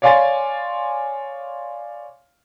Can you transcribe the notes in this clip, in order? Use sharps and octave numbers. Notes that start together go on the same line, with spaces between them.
C#5 D5 F5 G#5 C6 A6